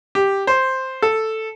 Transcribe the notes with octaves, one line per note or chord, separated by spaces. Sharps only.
G4
C5
A4